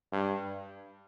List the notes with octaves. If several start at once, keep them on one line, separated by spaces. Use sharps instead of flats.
G2